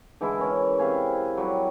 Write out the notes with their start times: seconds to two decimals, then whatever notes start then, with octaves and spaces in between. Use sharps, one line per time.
0.21 D3 E3 G#3 E4
0.38 C#4 A#4
0.79 C3 E4 F5 G#5
1.37 F#3 G3 F#4